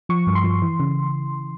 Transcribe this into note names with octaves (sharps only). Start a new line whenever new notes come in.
F3 C#6
G2
C6
F3
E3
C#3